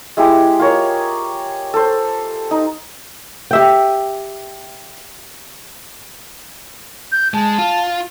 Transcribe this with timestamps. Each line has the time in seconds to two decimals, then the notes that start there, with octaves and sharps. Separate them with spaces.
0.17 G#3 E4 G4 G#4
0.59 F4 A#4 C#5
1.74 A4 C5
2.51 D#4
3.51 G4 E5 G5
7.12 G6
7.34 G#3 A5
7.58 F4